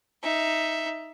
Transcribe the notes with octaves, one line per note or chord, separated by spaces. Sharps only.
D#4 E5